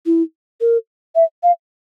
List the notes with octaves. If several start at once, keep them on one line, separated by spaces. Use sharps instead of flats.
E4
A#4
E5
F5